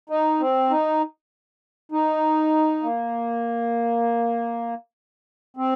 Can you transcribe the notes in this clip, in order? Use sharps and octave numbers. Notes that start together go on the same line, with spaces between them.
D#4
C4
D#4
D#4
A#3
C4